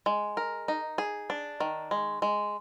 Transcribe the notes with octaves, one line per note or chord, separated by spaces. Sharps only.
G#3
A#4
D#4
G#4
D4
D#3
G#3
G#3